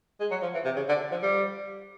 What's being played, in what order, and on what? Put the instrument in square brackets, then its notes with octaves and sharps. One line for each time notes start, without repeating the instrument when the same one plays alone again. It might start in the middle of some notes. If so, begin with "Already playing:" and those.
[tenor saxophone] G#3
F#3
F3
E3
C3
C#3
D3
F3
G3